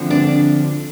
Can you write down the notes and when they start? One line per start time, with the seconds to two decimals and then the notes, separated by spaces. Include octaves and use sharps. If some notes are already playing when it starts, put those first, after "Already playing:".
Already playing: D2 D3 F3 C4
0.10 D4